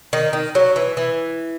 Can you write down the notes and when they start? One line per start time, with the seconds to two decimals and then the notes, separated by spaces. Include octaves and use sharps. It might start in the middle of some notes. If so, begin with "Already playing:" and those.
0.13 D#3
0.33 D#3
0.55 F#3
0.76 E3
0.97 E3